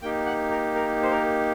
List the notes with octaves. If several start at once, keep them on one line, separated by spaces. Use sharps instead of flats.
A#3 D#4 G4 G5
F#5
A#4
A#4
C5
A#4